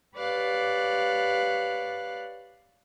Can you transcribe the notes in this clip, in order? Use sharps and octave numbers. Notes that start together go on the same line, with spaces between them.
G4 B4 C#5 D5 F5 F#6